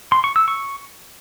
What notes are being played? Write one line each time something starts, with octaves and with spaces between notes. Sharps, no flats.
C6
C#6
E6
C#6